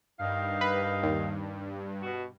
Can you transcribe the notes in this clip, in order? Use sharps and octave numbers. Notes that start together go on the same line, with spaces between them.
G2 D#3 D#4 F5
B4
D#2
B2 F#4